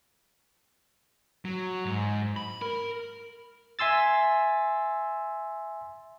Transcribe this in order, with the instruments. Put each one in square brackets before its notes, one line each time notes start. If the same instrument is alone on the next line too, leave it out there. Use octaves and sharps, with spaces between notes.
[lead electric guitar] F#3
G#2
B5
A#4
[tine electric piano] E5 G#5 C6 E6 A6